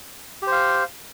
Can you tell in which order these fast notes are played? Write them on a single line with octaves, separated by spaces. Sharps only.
G4 C5 F5